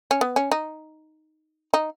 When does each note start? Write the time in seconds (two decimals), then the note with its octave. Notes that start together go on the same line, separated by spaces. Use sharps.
0.11 C#4
0.21 B3
0.36 C#4
0.51 D#4
1.74 D#4